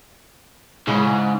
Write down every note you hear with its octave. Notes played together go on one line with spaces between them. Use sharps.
G#2 C#3 G#3 E4
C#4